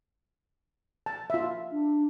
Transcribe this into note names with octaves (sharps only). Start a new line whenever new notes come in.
A5
F4 E5
D4